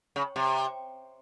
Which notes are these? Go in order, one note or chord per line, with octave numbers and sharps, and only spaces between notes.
C#3
C3